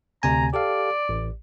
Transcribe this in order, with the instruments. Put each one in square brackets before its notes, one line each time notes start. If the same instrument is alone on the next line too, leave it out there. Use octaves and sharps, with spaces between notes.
[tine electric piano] D2 C3 G#5 [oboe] A#5
[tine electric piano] G4 A4 F5 [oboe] D5
[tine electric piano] A1